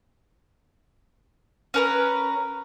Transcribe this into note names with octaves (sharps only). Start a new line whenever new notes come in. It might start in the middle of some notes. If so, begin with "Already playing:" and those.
C#4 A#4 B4